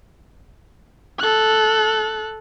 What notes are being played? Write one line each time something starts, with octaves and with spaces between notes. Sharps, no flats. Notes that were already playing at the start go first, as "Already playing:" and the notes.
A4 F#6